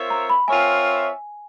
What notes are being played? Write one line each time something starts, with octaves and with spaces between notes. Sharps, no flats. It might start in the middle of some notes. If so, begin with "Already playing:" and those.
Already playing: C4 F4 A#4 C#5 E5
A#5
B5
C4 F4 A#4 C#5 E5 G#5